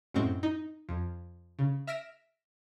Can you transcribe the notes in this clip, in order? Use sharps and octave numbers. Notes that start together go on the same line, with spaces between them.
F#2 A2 G#3 C4 C#6 G6
D#4
F2
C#3
E5 F6 A#6 B6 D7 E7